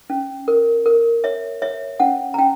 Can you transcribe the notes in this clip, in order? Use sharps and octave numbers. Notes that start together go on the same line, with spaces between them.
C#4
A#4
A#4
C#5 E5
C#5 E5
C#4 F#5
A#5
C#4 G5